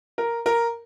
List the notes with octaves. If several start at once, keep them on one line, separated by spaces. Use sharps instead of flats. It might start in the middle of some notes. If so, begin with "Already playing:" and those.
A#4
A#4